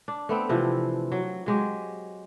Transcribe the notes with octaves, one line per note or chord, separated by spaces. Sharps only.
D4
A3 B3 C4
C3 E3 F3
F#3
F#3 G#3 G4